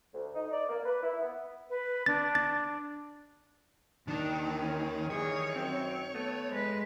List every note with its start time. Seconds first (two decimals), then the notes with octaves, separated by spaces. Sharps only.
0.14 D2
0.34 D#4
0.52 D5
0.69 A#3
0.86 B4
1.02 E4
1.20 B3
1.69 B4
2.06 D4 A6
2.35 A6
4.08 D#2 D#3 D4
4.61 C#4
5.10 D#3 E3 G3 G#4 C#5
5.54 F#2 C4
6.13 A3 B3
6.50 G#3 B4